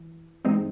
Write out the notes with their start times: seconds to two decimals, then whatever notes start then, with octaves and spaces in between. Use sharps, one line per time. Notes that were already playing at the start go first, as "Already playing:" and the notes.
Already playing: E3
0.45 G2 E3 G#3 C4 D#4